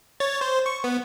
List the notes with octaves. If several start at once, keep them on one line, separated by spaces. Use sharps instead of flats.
C#5 A6
C5
C#6
B3